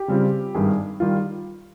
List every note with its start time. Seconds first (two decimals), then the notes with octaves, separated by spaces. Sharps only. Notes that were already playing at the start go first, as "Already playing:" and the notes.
Already playing: G4
0.08 C#3 G3 C4 F4
0.54 G#1 G2 D#3 G3 G#4
1.00 D#3 G3 F4